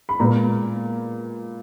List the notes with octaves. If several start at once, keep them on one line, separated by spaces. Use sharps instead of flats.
B5
A#2 G#3 B3 A#5